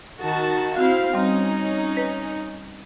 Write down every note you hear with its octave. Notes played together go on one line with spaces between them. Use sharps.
D#3 F#4 A5
C4 E4 F#4 F5
G3 C4 C#4 D#4
B4